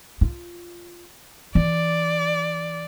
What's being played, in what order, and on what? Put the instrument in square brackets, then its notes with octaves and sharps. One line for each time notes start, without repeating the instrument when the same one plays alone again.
[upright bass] F4
[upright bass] E3 [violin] D5